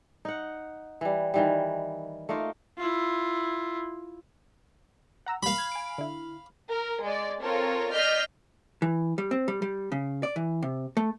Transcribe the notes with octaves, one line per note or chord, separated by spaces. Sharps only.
D#4 F#5
E3 G3
D#3 E3 G3
A3 A#3 D#4 F4
E4 F4
F#5 A#5 E6
G3 A#3 F5 B5
G#6
G#5 D7
D3 E4
A#4
G#3 D5
C4 F4 A4 A#4 C#5
D5 D#5 F6 G6 B6 C7
E3
G3
C4
G3
G3
C#3
D5
E3
C3
A3